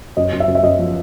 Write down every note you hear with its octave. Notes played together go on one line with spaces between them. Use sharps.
F#2 D#5
F#2
E5
F#2
E5
F#2 D#5
F3